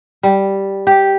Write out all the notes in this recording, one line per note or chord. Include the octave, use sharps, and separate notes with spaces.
G3
G4